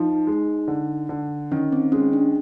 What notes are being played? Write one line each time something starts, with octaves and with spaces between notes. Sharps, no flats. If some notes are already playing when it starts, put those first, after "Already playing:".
Already playing: F3 D#4
G#3
D3
D3
D#3 C#4
C4
G#3 C#4
D4